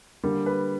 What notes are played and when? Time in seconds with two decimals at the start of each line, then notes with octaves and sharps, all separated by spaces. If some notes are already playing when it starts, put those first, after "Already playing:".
0.23 D3 G3 A#3
0.46 B4